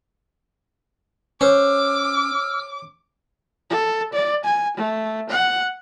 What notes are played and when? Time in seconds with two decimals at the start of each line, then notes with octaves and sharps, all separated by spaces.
1.41 C#4 C5 C#5 D6 E6 F6
3.70 A4
4.13 D5
4.45 G#5
4.77 A3
5.30 F#5